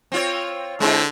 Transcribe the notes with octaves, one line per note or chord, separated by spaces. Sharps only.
C4 F4 C#5
D3 G#3 C4 E4